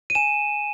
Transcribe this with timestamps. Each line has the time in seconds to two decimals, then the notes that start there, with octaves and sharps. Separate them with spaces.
0.10 D#7
0.15 G#5 E7